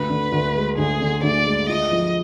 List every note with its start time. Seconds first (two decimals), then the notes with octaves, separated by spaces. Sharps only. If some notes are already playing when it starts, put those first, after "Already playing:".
Already playing: D2 B4
0.10 D3
0.32 D2
0.55 G#3
0.78 D2 G#4
1.01 D3
1.23 D2 D5
1.46 G#3
1.69 F4 D#5
1.92 F3